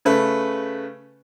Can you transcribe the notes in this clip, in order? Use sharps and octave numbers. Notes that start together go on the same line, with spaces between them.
C#3 A3 B4